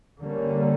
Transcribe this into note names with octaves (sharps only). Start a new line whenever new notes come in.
D3 G3 A#3 C#4